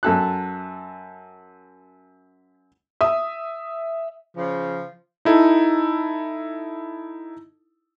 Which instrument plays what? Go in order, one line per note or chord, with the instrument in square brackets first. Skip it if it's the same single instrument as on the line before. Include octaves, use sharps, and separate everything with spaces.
[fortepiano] F#2 A4 F#6
[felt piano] E5 D#6
[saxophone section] C#3 F3
[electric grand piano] D#4 E4 A4